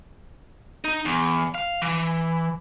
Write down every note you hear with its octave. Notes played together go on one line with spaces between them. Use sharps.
D#4
E2
F5
E3